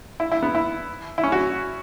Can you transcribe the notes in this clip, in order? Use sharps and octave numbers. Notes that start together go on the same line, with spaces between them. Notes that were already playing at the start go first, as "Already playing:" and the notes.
E4
E4
B3
E4
E4
C#4
F#4